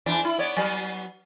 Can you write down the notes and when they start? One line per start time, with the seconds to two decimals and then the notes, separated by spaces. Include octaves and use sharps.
0.06 E2 E3 D4
0.25 E4
0.38 B3 C#5 D5
0.57 F#3 B3